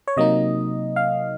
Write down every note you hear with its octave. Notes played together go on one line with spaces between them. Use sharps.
C#5
C3 F#3 A#3 D#4 D#5
F5